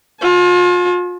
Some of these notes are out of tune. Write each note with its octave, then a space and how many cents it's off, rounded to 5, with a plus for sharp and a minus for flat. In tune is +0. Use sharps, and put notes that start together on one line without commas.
F4 +35 A5 -45